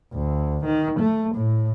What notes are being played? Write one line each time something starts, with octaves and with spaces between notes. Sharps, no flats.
D2
D#3
A3
A2